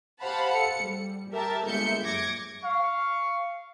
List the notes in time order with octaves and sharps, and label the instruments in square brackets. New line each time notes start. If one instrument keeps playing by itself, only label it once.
[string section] G4 C5 F5 F#5 A5 B5
A4 C#7
G3
G4 A#4 E5 A5
G1 G#3 A#3 E5 G6 C#7
F#2 D6 G#6 A#6 C#7
[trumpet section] F5 C#6